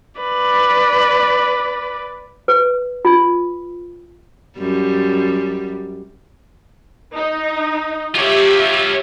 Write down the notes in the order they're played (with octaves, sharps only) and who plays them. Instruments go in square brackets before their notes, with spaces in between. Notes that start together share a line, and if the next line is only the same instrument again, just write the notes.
[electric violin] B4 D5
[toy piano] B4
F4
[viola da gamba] F#2 G3
[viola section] D#4
[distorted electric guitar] F4 C#5 [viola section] G4 E5